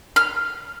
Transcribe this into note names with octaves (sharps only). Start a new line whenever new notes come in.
F6